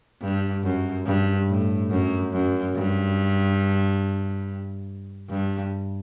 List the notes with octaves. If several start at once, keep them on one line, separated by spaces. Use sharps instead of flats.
G2
F#2
G2
A2
F#2
F#2
G2
G2